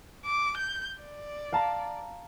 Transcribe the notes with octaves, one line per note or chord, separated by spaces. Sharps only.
D6
G6
D5
F5 A5 A#5